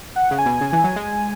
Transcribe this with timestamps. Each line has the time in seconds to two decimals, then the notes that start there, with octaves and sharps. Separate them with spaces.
0.16 F#5
0.31 C#3
0.39 G#5
0.46 B2
0.61 C#3
0.73 E3
0.84 F#3
0.96 G#3